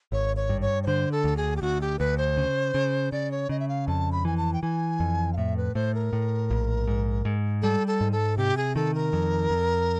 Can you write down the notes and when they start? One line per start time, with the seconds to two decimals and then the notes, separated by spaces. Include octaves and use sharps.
0.12 G#1 C#5
0.36 C#5
0.49 G2
0.61 C#5
0.83 C#5
0.87 D3 C5
1.12 A4
1.24 D2
1.37 G#4
1.57 G4
1.62 D2 F#4
1.81 G4
1.99 D2 B4
2.18 C5
2.37 C#3
2.74 C#3
3.12 C#3 D5
3.31 C#5
3.49 C#3 D#5
3.60 E5
3.69 F5
3.88 F2 A5
4.12 B5
4.25 E3 G#5
4.37 A5
4.53 G5
4.63 E3 G#5
5.00 F2
5.33 F5
5.37 A2 E5
5.57 B4
5.75 A2 C5
5.94 A#4
6.13 A2
6.50 A#1
6.87 G#2
7.25 G#2
7.62 G3 A4
7.87 A4
8.01 G#2
8.12 A4
8.37 C3 G4
8.57 G#4
8.76 D#3 A4
8.94 A#4
9.13 F2
9.50 F2